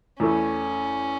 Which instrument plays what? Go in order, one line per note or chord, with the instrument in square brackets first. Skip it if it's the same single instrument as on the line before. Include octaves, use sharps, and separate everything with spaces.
[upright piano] E2 E3 A3 E4 [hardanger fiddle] C#4